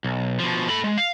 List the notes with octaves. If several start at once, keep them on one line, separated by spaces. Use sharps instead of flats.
B1
B2 F3
A4 B5
G#3
F5